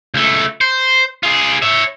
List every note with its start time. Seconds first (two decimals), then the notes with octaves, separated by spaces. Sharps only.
0.14 C#2 A3
0.61 C5
1.23 F4 G#4
1.62 C#5 E5